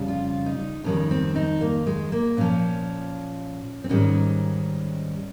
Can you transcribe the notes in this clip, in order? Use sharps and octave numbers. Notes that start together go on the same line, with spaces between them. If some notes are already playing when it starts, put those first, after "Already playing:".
Already playing: F2 C#3 G3
F4
D#4
F2 D#3 G3 C#4
C4
D#4
A#3
G#3
A#3
A#2 F3 C#4
C4
G#2 D#3 G3 C#4